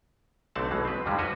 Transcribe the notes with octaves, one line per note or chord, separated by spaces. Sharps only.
B1 D3 A3 C4 F#5 A5
B1 B2 E3 G#3
C4 B4
F2 D3 D#3 F3 G3 G#3
F#4 B4 C#5 D#5